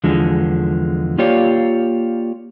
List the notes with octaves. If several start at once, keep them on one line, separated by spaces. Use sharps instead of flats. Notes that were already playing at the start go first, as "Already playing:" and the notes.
E2 D3 F3 G#3
A#3 F4 G4 C#5 D5 F5